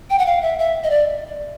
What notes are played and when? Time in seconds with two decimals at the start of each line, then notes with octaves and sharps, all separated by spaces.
0.10 G5
0.18 F#5
0.26 F5
0.42 E5
0.59 E5
0.84 D#5
0.90 D5